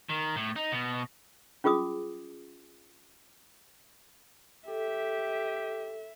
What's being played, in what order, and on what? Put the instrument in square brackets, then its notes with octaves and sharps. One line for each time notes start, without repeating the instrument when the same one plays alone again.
[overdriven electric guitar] D#3
A2
D#4
B2
[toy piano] C#4 F4 G#4 D6 D#6
[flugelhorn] G4 [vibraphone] A4 [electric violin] E5